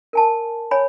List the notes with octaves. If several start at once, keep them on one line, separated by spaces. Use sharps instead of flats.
A#4 G#5 A5
C#5 G#5 B5